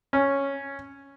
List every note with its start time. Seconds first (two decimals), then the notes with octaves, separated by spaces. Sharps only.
0.13 C#4